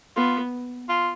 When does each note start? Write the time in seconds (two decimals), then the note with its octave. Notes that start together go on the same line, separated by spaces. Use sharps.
0.16 B3 F4
0.89 F4